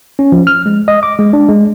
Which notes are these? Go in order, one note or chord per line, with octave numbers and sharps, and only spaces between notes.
C#4
F3
F6
G#3
D#5
D6
G#3
D4
G#3